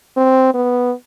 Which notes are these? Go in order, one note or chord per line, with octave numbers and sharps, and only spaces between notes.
C4
B3